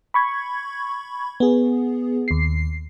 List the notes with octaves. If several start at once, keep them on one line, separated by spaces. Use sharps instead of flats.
B5 C#6 G#6
B3 G#4
D#2 C7